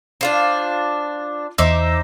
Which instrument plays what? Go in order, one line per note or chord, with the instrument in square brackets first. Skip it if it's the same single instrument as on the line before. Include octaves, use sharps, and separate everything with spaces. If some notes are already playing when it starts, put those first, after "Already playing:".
[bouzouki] D4 F4 C5
[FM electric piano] E2 D6 E6 [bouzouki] D#4 C5 E5